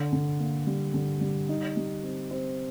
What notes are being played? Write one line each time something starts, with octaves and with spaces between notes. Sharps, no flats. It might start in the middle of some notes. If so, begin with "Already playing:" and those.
Already playing: D3
D3
A#3
G3
D3
G3
D#4
G3
C4
C4